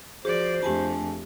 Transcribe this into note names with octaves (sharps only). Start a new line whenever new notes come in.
F3 F#4 G#4 C5 D5
F2 A3 D4 F4 G4 G#5 A5